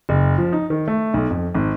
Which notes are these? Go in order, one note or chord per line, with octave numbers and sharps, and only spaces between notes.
F#1
F3
D#4
D#3
A3
B1
F2
G#1